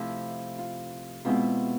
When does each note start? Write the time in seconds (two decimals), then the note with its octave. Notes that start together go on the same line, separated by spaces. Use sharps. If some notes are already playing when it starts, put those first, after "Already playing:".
Already playing: C3 F3 A3 E4
0.58 F4
1.25 B2 G#3 C4 E4 F4